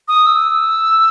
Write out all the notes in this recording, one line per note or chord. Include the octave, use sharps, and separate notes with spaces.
D#6
E6